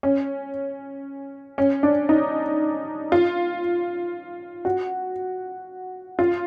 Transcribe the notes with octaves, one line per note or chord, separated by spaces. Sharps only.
C#4
C#4
D4
D#4
F4
F#4
F4